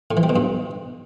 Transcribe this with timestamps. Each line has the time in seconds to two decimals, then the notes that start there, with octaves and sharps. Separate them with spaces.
0.11 A2
0.17 E3
0.23 G3
0.29 B2
0.36 G2